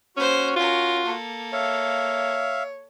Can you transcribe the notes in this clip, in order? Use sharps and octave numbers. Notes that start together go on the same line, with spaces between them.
A#3 C#4 F#4 C5
C#4 F4 A#4
A#3 A4
C#5 E5 F5